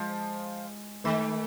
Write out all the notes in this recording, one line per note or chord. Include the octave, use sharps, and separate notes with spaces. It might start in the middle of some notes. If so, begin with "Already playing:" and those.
Already playing: F3 G#3
D#3 A3